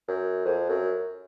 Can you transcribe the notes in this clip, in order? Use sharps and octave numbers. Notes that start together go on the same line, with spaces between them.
F#2
F2
F#2